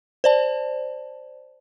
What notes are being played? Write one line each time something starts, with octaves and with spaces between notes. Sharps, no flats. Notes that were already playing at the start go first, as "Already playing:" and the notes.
C5 D5 A5